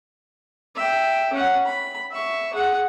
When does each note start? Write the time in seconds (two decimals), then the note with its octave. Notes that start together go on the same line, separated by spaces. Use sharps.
0.75 E5 G5
1.33 C#4 F#5
1.65 B5
2.11 E5 C#6
2.53 G#4 F#5